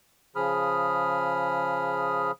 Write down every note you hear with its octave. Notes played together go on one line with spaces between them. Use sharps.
C#3 F3 G#4 B5 D#6 F6